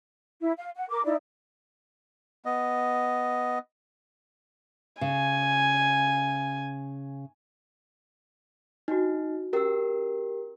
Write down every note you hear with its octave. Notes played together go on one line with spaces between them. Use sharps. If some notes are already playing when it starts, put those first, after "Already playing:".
E4
F5
F#5
A#4 D6
D#4 E4 D5
B3 D#5
C#3 G#5
D4 D#4 F#4
C#4 G4 A#4 E6